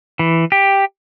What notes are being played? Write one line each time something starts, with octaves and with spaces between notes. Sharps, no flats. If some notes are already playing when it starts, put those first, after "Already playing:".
E3
G4